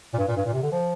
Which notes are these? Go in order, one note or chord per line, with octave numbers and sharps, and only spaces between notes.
A#2
G2
A#2
G2
A#2
C3
D3
F3